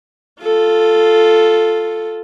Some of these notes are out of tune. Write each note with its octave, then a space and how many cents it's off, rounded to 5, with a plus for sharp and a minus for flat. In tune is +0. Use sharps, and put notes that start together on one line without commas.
F4 +0 A4 +0